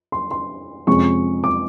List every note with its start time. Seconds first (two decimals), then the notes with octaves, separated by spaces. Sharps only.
0.12 C6
0.31 C6
0.87 F2 C3 F3 G#3 C#4 C#6
1.44 D6